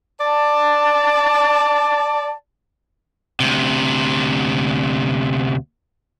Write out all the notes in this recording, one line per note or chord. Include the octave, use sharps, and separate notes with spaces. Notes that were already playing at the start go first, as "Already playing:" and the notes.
D5 A5
D2 C3